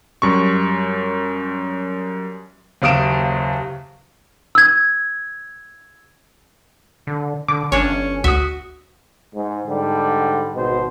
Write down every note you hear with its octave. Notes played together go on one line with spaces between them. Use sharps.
F#2 G3 C#6
F#1 D#2 F5 D#6 D7 E7
E6 G#6
D3
D3 D6
G1 C#4 D4 C#5
D2 F#4 E5 D#6
G#2
G#2 D3 G3
G#1 B2 C5